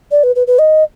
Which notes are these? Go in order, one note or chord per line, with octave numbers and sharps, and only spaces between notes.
D5
B4
B4
B4
D#5